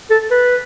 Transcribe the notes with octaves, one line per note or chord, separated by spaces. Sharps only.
A4
B4